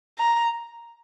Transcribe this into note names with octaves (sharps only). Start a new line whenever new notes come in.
A#5